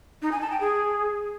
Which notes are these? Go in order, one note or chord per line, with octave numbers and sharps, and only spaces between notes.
D#4
G#5
A5
G5
G#4